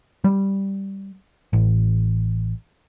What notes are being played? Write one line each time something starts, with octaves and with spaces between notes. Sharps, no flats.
G3
A1